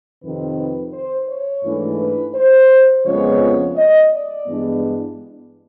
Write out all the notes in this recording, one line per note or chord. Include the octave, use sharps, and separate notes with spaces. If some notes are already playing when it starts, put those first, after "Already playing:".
F2 C3 D#3 B4
B4
C5
C#5
G#2 E3 A3 D4
B4
C5
F2 C#3 F3 G#3 B3 C#5
D#5
D5
G2 E3 G#3 B3 D4